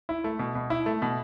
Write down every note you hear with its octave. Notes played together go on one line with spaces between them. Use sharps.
E4
A3
B2
B2
E4
A3
B2